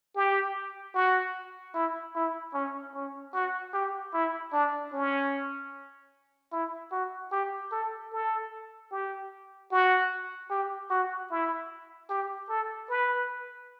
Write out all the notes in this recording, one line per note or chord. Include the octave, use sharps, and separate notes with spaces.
G4
F#4
E4
E4
C#4
C#4
F#4
G4
E4
D4
C#4
E4
F#4
G4
A4
A4
G4
F#4
G4
F#4
E4
G4
A4
B4